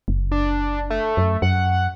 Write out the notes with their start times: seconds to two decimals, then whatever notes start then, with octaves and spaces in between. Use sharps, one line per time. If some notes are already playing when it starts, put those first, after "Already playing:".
0.08 F#1
0.31 D4
0.90 A3
1.17 F#2
1.42 F#2 F#5